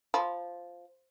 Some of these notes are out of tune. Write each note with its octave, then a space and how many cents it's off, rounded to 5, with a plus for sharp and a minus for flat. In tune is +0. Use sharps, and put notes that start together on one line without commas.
F3 +0 B5 -10